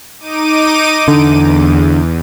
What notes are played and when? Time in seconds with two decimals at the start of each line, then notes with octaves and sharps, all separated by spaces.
0.19 D#4 D6 D#7
1.08 E2 D3